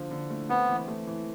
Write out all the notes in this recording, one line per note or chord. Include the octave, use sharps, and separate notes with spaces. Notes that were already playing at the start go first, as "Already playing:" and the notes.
Already playing: D3 F3
D3
A3
B3 C4
E3
A3
E3